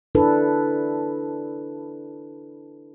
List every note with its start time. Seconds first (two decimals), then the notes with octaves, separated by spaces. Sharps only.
0.15 D4 E4 A4 B4